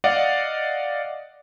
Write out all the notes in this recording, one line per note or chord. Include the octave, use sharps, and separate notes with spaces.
D5 D#5 F5 F#5